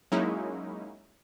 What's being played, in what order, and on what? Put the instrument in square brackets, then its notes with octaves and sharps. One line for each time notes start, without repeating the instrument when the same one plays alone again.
[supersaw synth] F#3 G#3 A#3 C#4 D#4 E4